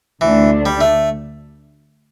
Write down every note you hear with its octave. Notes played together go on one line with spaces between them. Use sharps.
D2 D3 E3 A3 D4
G3
A3